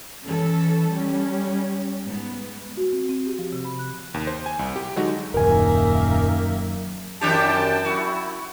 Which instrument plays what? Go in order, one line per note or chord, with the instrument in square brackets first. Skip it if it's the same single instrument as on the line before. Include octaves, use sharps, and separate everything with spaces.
[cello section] E3 C#4 A4
G3 C#4
G#2 B3
[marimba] F#4
C4
C4
G4
F3
C3
B5
F#6
[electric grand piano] D#2
C5
G#5
C2
G4
D3 F#3 G#3 D#4 F#4
[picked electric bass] D#1 [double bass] F#2 D#3 [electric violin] A#3 E5 [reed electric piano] A#4 G#5
[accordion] F#2 G5 A5 [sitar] D#3 D4 G4
[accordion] E4 [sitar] F#4